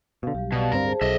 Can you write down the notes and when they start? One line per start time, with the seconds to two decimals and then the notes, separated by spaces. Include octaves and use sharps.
0.23 B2 D3 F5
0.35 B1 G3 G4
0.52 B2 G4 D5 F5
0.72 D1 G2 C4 A#4
0.85 G#4 C5 A5
1.01 B1 G#4 A4 C5 D#5 E5